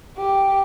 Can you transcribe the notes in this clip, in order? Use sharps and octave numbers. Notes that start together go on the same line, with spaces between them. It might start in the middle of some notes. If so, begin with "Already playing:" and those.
G4